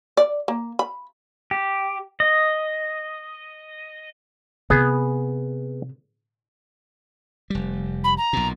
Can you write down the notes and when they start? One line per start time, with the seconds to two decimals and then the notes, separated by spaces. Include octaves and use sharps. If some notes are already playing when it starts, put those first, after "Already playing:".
0.17 D5
0.48 A#3
0.79 B5
1.51 G4
2.20 D#5
4.70 C3 B3 G#4
7.50 F1 G3
8.04 B5
8.17 A#5
8.33 B1 A#2